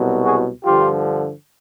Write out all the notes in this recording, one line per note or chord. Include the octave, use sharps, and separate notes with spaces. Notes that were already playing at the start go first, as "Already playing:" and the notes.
Already playing: C2 B2 F#3
F#4 G#4
G2 D3 F3 F4 G4